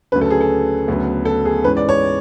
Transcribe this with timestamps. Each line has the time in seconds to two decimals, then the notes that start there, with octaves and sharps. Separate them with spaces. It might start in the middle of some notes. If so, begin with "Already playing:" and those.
0.12 D2 C#3 F#3 C#4 B4
0.21 A4
0.30 G#4
0.41 A4
0.88 D2 C#3 F#3 B3
1.25 A4
1.45 G#4
1.64 G#2 E3 G#3 C#4 B4
1.77 D5
1.89 C#5